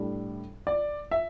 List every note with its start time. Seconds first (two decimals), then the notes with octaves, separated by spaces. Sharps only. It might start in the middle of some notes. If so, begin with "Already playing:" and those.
Already playing: A2 G3 D4
0.67 D5
1.11 E5